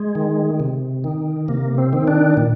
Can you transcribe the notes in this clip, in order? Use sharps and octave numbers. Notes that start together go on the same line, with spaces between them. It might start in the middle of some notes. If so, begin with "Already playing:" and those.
Already playing: G#3
D#3
C3
D#3
C3 A#3
C4
D#3
D4
A#2